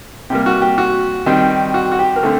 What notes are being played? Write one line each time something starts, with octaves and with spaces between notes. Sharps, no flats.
C3 G3 A#3 G4
F#4
G4
F#4
D#3 G3 C4
F#4
F#4
G4
A#4
D3 A3 C4 A4